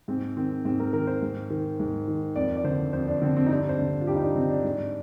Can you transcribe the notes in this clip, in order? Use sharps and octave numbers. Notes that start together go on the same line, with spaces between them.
G#2 C4
D#3 C4
G#2 C4
A#4
D#3 A#4
C5
G#2
D#3
G#2
D#3
F2 D5
D5
D3 C5
F2 C5
D4
D3 C4
C4
D#4
G2 D4
C5
D3
F4
G2 G4
D#4
D4
D3 C4
D4
G#2